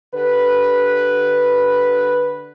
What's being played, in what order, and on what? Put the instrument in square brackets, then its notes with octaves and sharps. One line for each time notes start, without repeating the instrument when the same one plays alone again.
[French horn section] D3 G4 B4